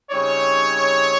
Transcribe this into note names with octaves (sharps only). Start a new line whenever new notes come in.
C#3 G3 C4 D#4 C#5